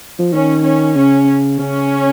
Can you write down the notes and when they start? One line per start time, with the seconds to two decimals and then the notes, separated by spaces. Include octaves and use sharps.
0.19 F3
0.33 D#3 C#4
0.65 C#4
0.96 C#3 C#4
1.59 C#3 C#4